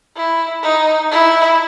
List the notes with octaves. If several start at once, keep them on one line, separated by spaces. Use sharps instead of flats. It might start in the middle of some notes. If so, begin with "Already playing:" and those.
E4
D#4
E4